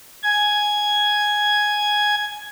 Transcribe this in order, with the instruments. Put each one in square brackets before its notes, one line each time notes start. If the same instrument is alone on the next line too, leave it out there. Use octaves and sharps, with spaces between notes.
[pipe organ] G#5 G#6